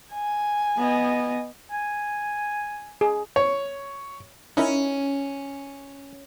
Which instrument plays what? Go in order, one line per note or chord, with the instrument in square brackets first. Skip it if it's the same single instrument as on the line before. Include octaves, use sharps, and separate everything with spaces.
[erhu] G#5
[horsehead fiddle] B3 D#5
[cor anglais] G#5
[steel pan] G#4
[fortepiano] C#5
[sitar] C#4 [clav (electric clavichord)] D#4 E4 A#4